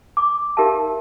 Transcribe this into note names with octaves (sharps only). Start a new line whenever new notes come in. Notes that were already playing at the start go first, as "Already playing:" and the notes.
D6
D#4 G4 A#4 E5 F5 A5